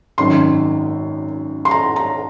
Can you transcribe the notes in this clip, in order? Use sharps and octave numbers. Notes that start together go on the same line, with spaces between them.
G#1 F#2 D#3 C6
C6
A#5
A#5